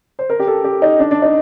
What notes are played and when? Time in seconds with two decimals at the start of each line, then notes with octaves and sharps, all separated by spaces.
0.19 C5
0.30 A#4
0.39 G4
0.47 A4
0.64 G4
0.82 D#4
0.99 D4
1.11 D4
1.22 D#4